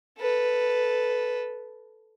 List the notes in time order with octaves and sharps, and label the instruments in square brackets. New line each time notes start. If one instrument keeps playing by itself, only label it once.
[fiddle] A4 B4